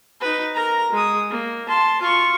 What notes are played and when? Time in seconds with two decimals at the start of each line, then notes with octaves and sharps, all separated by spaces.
0.21 D#4 B4
0.55 A#4 A#5
0.92 G#3 D#6
1.30 A#3
1.69 A5 C6
2.02 F4 C#6